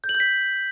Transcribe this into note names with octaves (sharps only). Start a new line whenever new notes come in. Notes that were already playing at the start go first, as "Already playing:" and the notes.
G6
F#7
G6
B6